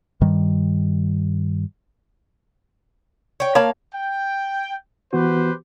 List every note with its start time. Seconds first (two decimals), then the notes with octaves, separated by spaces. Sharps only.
0.21 G2 D#3 G3
3.40 C#5 G5
3.55 A#3 C#5 F5 A5 B5
3.94 G5
5.13 E3 B3 F#4 G4 B4 C5